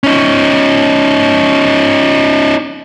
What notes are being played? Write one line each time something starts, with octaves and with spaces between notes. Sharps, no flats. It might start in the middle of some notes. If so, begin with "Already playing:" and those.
C#4 D#4